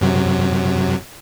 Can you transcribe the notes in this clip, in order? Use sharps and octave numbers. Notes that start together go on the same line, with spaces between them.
F#2 C3 F#3